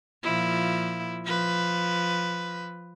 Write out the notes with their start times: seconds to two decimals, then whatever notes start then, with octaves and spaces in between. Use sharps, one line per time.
0.23 A#2 F3 E4
1.25 F3 B4